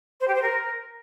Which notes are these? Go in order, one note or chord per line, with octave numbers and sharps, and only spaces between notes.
C5
G4
C5
A#4